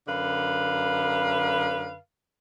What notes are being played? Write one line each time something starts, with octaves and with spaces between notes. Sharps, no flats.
F#2 D3 B4 F5